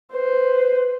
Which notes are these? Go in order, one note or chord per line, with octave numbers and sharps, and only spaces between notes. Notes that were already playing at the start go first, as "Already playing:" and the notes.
B4 C5